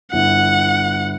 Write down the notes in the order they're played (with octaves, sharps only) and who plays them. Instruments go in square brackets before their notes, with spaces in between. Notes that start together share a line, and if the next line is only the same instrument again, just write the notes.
[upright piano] G1 E4 [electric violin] F#5